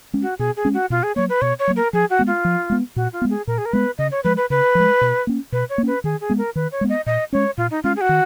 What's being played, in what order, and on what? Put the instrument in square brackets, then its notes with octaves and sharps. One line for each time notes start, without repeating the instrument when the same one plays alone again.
[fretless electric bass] G#3 C#4
[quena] F#4
[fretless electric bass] B2 [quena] G#4
[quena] G#4
[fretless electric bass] G#3 C#4
[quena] F#4
[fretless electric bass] B2 [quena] F4
[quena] G#4
[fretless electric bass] F#3 A#3 [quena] C#5
[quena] B4
[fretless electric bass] B2 [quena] C#5
[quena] C#5
[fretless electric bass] F#3 A#3
[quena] A#4
[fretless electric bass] F3 [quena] G#4
[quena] F#4
[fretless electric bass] G#3 B3
[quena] F4
[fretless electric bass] F3
G#3 B3
[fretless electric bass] A#2 [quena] F#4
[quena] F4
[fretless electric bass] G#3 B3
[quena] G#4
[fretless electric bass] A#2 [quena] A#4
[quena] G#4
A#4
[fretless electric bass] G#3 B3 [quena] B4
[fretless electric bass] C#3 [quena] D#5
[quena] C#5
[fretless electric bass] F3 G#3 [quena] B4
[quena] B4
[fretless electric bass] C#3 [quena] B4
[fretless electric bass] F3 G#3
B2
A#3 C#4
[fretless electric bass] B2 [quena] B4
[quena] C#5
[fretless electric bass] A#3
[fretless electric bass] C#4 [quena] B4
[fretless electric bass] D#3 [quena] G#4
[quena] G#4
[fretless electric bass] G#3 B3
[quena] A#4
[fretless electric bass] D#3 [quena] B4
[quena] C#5
[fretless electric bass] G#3 B3
[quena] D#5
[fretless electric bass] A#2 [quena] D#5
[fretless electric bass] G#3 C#4 [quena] C#5
[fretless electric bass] A#2 [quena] F4
[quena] D#4
[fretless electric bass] G#3 C#4 [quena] F4
[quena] G#4
F#4
[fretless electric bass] D#3